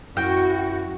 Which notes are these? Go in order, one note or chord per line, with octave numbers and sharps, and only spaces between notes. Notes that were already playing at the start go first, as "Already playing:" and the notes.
F#2 E4 F#4 G5